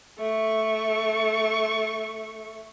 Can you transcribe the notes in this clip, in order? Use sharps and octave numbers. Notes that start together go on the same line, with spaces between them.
A3 C#6